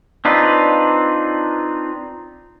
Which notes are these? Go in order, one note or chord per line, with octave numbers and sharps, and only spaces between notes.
C4 D4 D#4 F4 B4